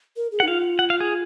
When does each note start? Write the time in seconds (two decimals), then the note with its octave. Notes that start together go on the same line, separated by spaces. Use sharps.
0.16 A#4
0.32 G#4
0.40 F#5
0.43 D#4
0.48 F4 F5
0.79 F#5
0.90 F5
1.00 G#4